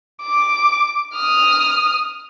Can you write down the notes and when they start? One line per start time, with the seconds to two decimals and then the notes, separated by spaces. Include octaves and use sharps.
0.22 D6
1.16 D#6 F6